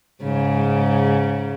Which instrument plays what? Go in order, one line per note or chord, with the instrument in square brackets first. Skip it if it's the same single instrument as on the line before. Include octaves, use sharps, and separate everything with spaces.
[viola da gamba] G#2 C#3